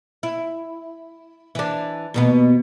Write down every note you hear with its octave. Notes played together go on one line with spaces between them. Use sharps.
E4
E3 D4
D#2 B2 B3